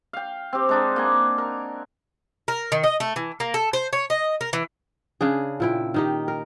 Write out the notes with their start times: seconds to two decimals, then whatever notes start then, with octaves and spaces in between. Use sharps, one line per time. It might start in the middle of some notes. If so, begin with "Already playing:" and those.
0.13 F5 G5
0.53 C4 G4
0.69 G#3 D4 D#4
0.96 A#3 F#5 G#5
1.38 A#4
2.48 A#4
2.72 D#3
2.83 D#5
3.00 A3
3.16 E3
3.40 A#3
3.54 A4
3.73 C5
3.93 C#5
4.10 D#5
4.41 A#4
4.53 E3
5.21 C#3 D4 G#4
5.60 A#2 E4 G5
5.94 D#3 D#4 G4
6.28 A#4